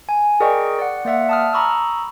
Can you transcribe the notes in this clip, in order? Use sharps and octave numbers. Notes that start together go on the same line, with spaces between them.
G#5
G#4 A#4 D5 D#5 G5 C#6
D5 F#5
A#3 D5 E5 F#5
A5 D#6 F6
A#5 B5 C#6 D#6 E6